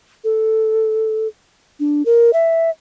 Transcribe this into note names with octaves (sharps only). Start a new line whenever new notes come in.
A4
D4
A#4
E5